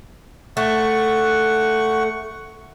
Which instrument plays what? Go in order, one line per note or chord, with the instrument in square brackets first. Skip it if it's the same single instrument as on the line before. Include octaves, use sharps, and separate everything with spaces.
[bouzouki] A3 [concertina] F#5 C#6